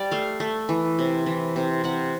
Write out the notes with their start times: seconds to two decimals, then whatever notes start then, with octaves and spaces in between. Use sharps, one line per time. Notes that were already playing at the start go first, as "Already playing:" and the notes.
Already playing: G3 D5
0.11 A3 F5
0.40 A3
0.69 E3
0.99 C3
1.26 E3
1.56 C3
1.84 C3 F#5